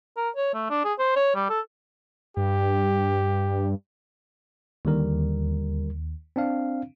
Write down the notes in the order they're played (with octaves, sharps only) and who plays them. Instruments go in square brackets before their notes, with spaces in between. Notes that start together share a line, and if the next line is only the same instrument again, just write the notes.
[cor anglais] A#4
C#5
A3
D4
G#4
C5
C#5
G3
A4
[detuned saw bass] G2 [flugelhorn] G4
[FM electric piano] D#2 [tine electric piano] D3 G3 A#4
[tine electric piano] C4 D4 F5